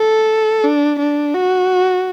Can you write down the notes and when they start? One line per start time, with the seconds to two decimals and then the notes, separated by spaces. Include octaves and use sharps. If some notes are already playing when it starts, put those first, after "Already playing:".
Already playing: A4
0.64 D4
1.00 D4
1.35 F#4